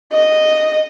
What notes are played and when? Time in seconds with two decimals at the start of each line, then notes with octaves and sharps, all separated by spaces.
0.12 D#5